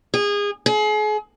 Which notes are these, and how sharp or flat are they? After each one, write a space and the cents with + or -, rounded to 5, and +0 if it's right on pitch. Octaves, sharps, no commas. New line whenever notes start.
G#4 -25
G#4 +35